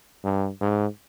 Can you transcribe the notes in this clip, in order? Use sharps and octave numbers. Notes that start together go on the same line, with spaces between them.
G2
G#2